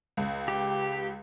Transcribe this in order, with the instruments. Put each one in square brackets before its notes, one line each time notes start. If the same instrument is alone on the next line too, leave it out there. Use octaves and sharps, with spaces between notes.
[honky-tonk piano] C#2
[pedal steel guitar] G4